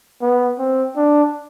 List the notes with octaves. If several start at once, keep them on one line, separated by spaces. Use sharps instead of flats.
B3
C4
D4